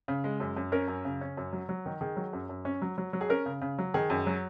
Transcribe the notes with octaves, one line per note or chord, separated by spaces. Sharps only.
C#3
G#3
F#2
F#2
C#4 A#4
F#2
C#3
C#4
F#2
F#3
F#3
D#3
D#3 G#4
F#3
F#2
F#2
C#4
F#3
F#3
F#3
G#4
C#4 A#4
C#3
C#3
F#3
D#3 G#4
F#2
F#3